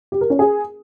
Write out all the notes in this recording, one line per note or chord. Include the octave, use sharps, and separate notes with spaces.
G4
A#4
C#4
G#4